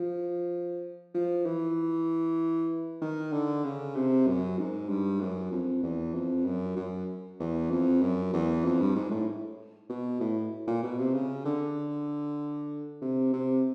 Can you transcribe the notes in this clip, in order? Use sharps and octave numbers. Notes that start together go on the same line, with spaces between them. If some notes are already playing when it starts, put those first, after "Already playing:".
Already playing: F3
F3
E3
D#3
D3
C#3
C3
F#2
G#2
G2
F#2
F2
E2
F2
F#2
F#2
E2
F2
F#2
E2
F2
G2
G#2
A2
B2
A2
A#2
B2
C3
C#3
D3
C3
C3